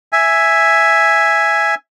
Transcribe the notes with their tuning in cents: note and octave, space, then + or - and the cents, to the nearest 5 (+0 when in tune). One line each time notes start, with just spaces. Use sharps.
E5 +0 G#5 +0